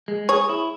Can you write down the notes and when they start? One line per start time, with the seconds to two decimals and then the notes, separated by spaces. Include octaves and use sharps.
0.08 G#3
0.29 G#4 C#5
0.49 E4